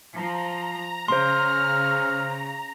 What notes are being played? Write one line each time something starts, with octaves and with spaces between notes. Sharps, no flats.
F3 A#5
C#3 C5 C6 F6